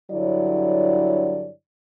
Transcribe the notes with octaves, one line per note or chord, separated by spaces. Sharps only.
G2 D3 F#3 E4 C#5 D5